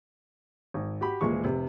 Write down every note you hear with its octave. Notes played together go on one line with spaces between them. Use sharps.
G#1
F#4 G4 B5
D#1 A#2 E3 G#3 C#6
F1 C3